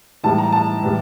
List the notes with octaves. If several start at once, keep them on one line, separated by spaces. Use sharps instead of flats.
A2 E3 G3 A5
A#5
A5
A2 E3 G3